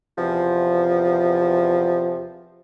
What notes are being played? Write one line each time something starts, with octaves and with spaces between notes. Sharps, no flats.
E2 C3 F3